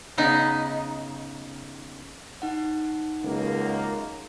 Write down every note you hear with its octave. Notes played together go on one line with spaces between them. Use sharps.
C#3 B3 D#4
D#4 F#5
C#2 F#2 A#3